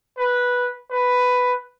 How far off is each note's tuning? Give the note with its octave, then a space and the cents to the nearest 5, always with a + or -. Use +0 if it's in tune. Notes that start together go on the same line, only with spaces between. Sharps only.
B4 -10
B4 +5